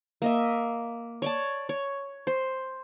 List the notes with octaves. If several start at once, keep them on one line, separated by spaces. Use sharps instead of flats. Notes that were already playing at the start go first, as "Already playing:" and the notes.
A#3 D#5 E5
C#5 D5 A5
C#5
C5